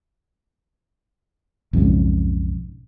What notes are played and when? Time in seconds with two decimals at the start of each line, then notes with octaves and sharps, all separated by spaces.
1.73 B1 F2 G#2 C#3